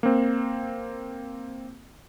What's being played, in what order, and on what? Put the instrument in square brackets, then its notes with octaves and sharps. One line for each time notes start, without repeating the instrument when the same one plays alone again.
[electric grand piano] A#3 C4